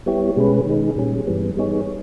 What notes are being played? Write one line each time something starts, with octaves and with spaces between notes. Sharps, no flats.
G3 B3 E4 G4 C#5
B2 G#3 C#4 G#4 B4
D#3 G#3 D#4 G#4
A#2 G3 C#4 G#4
G2 E3 G3 B3
G3 B3 D#4 G#4 C#5